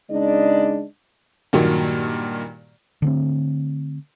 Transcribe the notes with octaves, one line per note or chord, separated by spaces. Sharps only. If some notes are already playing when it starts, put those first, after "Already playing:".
C#3 G#3 D4 D#4 D5 D#5
G2 A#2 D#3 F#3 A#3
D3 A3 C4